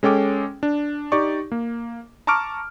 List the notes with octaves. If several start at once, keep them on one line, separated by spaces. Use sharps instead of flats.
G#3 C#4 A4 G5 D6
D4
D#4 G4 D5 C#6
A#3
A5 A#5 C#6 D6 F6 D7